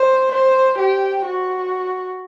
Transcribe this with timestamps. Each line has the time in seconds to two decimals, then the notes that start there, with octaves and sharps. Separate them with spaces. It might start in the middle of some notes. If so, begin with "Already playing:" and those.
Already playing: C5
0.32 C5
0.78 G4
1.26 F#4